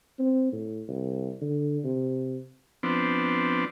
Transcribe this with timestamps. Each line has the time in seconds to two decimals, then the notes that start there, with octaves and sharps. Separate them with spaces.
0.19 C4
0.52 A2
0.88 C2
1.41 D3
1.84 C3
2.83 F3 B3 C4 D4